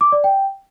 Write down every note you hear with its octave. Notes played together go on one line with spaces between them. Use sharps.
D6
D5
G5